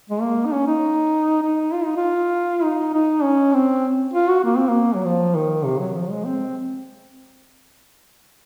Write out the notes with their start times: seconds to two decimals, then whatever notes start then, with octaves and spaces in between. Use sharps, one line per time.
0.10 G#3
0.22 A#3
0.46 D#4
0.52 C#4
0.67 D#4
1.42 D#4
1.73 F4
1.84 D#4
1.97 F4
2.63 D#4
2.93 D#4
3.23 C#4
3.53 C4
4.14 F4
4.29 F#4
4.44 A#3
4.57 C4
4.69 A#3
4.95 F#3
5.04 F3
5.35 D#3
5.65 C3
5.79 F#3
5.95 F3
6.10 G#3
6.25 C4